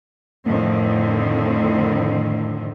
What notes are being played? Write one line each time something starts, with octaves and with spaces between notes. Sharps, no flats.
F2 A2 D3 D#3 C4